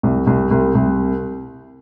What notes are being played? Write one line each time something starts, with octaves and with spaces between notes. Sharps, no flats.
C2
C2
C2
C2